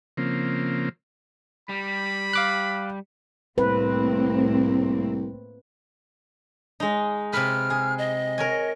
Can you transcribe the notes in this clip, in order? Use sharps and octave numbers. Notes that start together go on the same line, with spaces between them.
C#3 F3 A#3 C4
G3 B5
F5 D6 F#6
C2 A2 A#3 C4 B4
G#3 D#4
C3 B4 F6
G#4
D#5
A#4 C#5 G#5